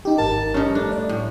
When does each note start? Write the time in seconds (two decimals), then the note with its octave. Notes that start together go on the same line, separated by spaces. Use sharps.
0.05 D#4 G4
0.18 G#1 A#4 A5
0.54 G2 C#4 D#4
0.75 A3 D4
0.92 D5
1.09 A2